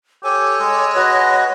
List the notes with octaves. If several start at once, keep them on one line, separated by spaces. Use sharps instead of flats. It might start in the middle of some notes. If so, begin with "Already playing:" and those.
G4 A4 C#5 G#5
G#3
F#4 B4 D#5